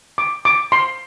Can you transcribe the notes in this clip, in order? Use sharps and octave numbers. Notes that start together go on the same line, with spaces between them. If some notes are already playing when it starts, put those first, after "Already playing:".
D6
D6
C6